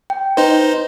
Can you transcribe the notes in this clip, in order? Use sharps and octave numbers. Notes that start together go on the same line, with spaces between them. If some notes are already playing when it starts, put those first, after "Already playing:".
G5
D#4 B4 C5